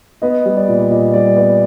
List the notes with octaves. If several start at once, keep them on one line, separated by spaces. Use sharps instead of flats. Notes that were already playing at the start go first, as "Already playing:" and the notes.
B3 D#5
G3
D5
A#2
A#2 D#5
G3 D5
B3 D5